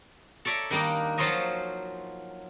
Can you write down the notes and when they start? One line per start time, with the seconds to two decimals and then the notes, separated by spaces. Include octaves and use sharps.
0.45 A4 C#5 D5 E5 A#5
0.71 D#3 G3 A#3 D4 D#4
1.18 F3 F#3 F4 C5 C#5 D#5